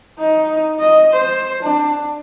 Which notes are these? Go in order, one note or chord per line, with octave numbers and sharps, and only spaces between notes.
D#4
D#5
C5
D4